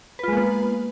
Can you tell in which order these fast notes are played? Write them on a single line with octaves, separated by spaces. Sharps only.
B4 F4 G#3 A#3 B3